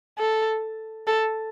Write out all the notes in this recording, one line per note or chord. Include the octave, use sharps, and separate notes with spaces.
A4
A4